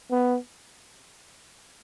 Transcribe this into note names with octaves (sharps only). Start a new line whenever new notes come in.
B3